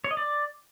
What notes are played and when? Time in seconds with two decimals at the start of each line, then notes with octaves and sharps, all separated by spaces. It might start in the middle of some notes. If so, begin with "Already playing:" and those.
0.04 C#5
0.11 D#5
0.17 D5